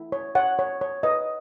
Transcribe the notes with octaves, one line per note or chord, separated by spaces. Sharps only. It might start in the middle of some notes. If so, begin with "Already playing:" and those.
Already playing: E4
C#5
C#5 F#5
C#5
C#5
B4 D#5